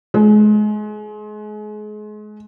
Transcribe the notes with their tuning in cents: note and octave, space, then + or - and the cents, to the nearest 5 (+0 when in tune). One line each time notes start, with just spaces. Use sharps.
G#3 +30